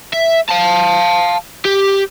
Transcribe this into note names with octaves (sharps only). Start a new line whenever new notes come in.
E5
F5 A5
G4